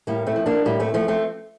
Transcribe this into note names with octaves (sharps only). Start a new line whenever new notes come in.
A2 G3 A#3
A3 C4
F3
A#3 D4
A2 G3 A#3
A3 C4
F3 A3 C4
A3 C4